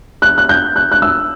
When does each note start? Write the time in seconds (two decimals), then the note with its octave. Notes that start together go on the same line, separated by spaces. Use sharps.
0.22 F#6
0.38 F#6
0.49 G6
0.76 F#6
0.92 F#6
1.02 E6